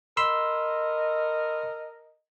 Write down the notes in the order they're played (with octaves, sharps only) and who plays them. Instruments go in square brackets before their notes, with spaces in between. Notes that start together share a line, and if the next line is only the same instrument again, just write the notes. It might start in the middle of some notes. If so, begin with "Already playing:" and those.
[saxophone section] A4 A#4 D#5 [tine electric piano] B5 C6 E6